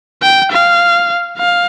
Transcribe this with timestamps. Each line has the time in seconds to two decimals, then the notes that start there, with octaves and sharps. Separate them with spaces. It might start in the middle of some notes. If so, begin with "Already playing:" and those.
0.22 G5
0.52 F5
1.38 F5